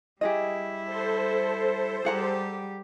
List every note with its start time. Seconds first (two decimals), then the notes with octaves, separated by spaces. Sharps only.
0.21 G3 E4 G4 G#4 D#5
0.85 A4 C5
2.05 G3 G4 G#4 F#5 A#5